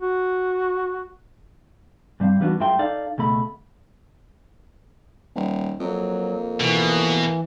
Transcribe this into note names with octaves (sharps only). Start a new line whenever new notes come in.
F#4
G2 G3 C4 F5
E3 G3 B3 D4 F#4
F#2 G#3 F4 E5 G5 C6
D#4 A4 D5 F5
C#2 B2 A3 B5
D#1
F2 F#3 A#3
B2 E3